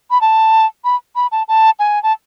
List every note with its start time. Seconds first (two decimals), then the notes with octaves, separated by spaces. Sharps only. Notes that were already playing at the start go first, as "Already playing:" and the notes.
0.11 B5
0.21 A5
0.84 B5
1.16 B5
1.32 A5
1.48 A5
1.79 G#5
2.03 A5